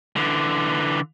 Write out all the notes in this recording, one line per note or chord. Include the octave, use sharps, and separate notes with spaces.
D3 E3